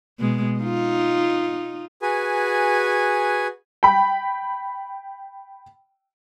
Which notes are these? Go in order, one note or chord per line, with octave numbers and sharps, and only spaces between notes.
B2 G#3
D#4 F4
F#4 G#4 B4 G#5
G5 B5